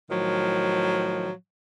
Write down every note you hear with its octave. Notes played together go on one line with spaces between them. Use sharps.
A2 D#3 F3 F#3